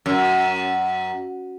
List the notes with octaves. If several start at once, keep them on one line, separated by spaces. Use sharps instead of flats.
F#2